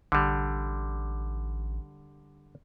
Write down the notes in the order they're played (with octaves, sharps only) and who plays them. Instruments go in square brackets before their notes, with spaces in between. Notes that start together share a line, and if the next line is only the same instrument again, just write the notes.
[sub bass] A1 [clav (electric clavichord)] D3 G3